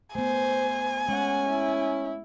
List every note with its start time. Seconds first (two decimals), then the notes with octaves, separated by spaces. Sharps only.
0.15 A3 B3 C5 G#5
1.09 G#3 C#4 F#5
1.49 E4